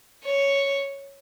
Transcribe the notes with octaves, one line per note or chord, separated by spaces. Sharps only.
C#5